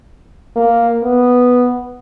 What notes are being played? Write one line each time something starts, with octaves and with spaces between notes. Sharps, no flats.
A#3
B3